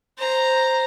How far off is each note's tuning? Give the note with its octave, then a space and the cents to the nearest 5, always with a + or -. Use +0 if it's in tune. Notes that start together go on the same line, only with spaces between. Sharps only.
C5 +0 A#5 +0